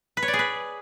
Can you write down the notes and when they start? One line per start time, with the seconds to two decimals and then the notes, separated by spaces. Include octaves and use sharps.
0.17 B4
0.23 C#5
0.28 D5
0.34 G#4
0.39 B4